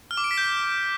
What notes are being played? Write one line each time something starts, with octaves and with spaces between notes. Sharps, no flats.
F6
D6
D7
B6
G6